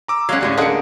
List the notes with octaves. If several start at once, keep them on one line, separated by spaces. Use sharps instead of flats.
A#5 D6 E6
F#3 G#3 C#4 F5 F#5
D2 A2 G3 G#3 C#4
D3 A#3 G#4 D#5 F#5 C#7